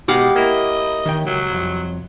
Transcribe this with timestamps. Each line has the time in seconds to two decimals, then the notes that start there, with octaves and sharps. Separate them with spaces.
0.08 B2 G#3 G4 F5 F#5
0.36 A#3 E4 D#5
1.05 D#3 C#5 G5
1.27 C#2 F#3
1.51 C2 F2